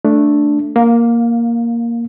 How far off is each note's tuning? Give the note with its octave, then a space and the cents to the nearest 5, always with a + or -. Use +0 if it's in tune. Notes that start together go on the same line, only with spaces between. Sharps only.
A3 +0 D4 +0
A#3 +0 F5 +25